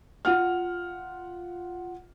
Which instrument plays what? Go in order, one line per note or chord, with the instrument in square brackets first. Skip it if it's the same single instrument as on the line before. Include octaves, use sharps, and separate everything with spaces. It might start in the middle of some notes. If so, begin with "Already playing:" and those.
[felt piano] F4 F#5 F6